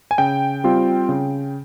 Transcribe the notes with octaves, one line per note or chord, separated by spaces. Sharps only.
G#5
C#3 G5
G3 C4 F4
C#3